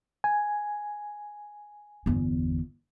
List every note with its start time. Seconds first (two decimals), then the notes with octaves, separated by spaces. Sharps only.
0.24 G#5
2.06 G1 E2